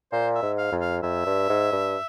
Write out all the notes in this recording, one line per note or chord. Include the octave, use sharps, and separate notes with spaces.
A#2 C5
E5
G#2
F5
F2
F5
F2 E5
G2
G#2
G2